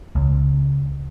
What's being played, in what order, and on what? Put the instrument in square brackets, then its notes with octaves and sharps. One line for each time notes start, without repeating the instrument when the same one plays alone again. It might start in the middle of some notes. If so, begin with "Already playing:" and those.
[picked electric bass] C#2